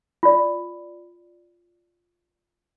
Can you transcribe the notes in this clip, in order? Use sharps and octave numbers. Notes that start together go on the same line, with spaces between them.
F4 D5